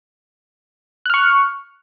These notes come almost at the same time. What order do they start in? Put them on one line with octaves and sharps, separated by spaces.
F#6 F6 C#6